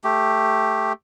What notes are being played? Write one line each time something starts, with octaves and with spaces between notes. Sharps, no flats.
A3 G4